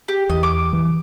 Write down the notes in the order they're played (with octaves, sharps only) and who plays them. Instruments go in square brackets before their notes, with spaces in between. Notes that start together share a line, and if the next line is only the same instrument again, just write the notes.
[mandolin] G4
[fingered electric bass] E2 [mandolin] D#5
[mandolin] D6
[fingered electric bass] E3